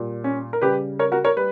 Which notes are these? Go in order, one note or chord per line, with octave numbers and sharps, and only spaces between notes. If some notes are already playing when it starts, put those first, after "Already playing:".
Already playing: A#2 G3
C#4
A#4
C#3 G3 G4 B4
A#4 C#5
F#4 A#4
A#4 C#5
G3 B4